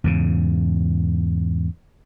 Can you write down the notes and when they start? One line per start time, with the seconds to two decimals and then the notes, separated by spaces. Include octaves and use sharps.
0.04 E2 G#2 C#3